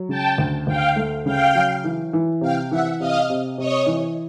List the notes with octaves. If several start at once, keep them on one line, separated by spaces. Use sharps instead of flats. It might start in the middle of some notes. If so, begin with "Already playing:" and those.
Already playing: F#3
C#3 G5 A5
D2
D2 F5 G5
A3
C#3 F5 G5
F#3
E3
E3
C3 F5 G5
E3 E5 F#5
C3 D#5 F5
C3
C3 C#5 D#5
E3